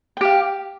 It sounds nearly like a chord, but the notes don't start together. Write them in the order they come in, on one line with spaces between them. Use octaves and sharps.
G5 G4 F5